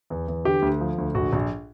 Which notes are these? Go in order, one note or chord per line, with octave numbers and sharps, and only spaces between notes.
E2
E2
D3 G4
D2
F3
D2
A#1 F#4
A#1